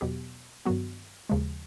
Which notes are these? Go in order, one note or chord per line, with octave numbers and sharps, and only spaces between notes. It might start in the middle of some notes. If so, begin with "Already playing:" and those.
E2 B2 F#3 B3 G4
G2 D#3 F#3 B3 F#4
D#2 C#3 F3 G#3